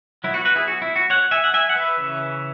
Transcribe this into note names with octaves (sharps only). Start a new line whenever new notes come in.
F#3 B3 E4
F#4
F#4 B4
E4 G#4
F#4
E4
F#4
C#5 F#5
E5 G#5
F#5
E5 G#5
F#5
B4 E5
C#3 E3 C#4